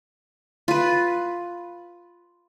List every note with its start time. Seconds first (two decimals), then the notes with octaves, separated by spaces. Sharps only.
0.68 F4 B4